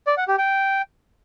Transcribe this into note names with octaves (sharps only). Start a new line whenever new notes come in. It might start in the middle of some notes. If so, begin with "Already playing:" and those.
D5
F#5
G4
G5